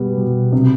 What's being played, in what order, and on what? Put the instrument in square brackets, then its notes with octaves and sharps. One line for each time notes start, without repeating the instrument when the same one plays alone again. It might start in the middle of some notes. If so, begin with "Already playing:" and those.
Already playing: [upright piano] B2 G3 B3
B2
C3